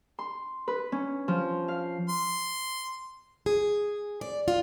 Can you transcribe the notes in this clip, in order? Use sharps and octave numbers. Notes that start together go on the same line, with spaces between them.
C6
B4
C#4
F3
F5
C6
G#4
D5
F4